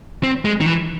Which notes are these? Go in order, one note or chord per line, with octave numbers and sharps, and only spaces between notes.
C4
G#3
D#3
E3